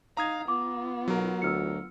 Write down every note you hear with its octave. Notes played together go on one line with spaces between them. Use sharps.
D#4 F5 A#5 D#6 G#6
B3 F4 D6
B1 F#3 A#4
D2 E6 F6 C#7